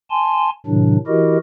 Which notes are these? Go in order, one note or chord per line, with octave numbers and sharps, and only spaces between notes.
G#5 A5 C6
A2 C3 D#3 F#3 D4
E3 E4 F#4 G4 A#4 D#5